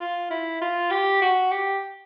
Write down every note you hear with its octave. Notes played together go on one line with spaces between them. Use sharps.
F4
E4
F4
G4
F#4
G4